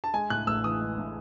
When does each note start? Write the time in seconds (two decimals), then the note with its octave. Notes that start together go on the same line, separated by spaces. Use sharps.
0.04 A5
0.14 G#3 G#5
0.30 A2 F#6
0.47 A1 E6
0.64 E3 D#6
0.81 G#3
0.98 A2